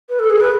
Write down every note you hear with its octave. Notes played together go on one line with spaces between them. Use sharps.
B4
A4
G#4
B4